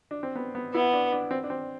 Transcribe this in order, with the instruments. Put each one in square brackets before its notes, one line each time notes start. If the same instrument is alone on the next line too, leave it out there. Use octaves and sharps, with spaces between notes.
[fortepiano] D4
C4
B3
B3
[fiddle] B3 [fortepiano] E4
[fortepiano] D4
D4
C4
D4
C4